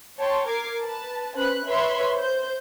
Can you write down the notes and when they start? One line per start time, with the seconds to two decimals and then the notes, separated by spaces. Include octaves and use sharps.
0.19 C#5 G5 A5 C6
0.48 A#4 D6 G#6 C7
0.82 B4 A5
1.35 C#4 B4 C5 B5 F#6
1.66 B4 C#5 E5 B5 C6
2.16 C5 G6